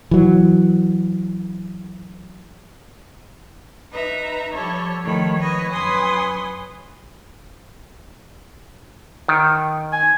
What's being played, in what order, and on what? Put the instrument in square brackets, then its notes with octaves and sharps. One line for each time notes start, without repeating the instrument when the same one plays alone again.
[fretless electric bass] E3 F#3
[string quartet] D#4 B4 E5 A#5
F3 G3 A4 C#5
D#3 F3 A3 C#5 B5
B4 C#5 D#5
F#2 B4 C#5 G#5 C6 D#6
[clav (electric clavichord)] D#3
[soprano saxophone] G#5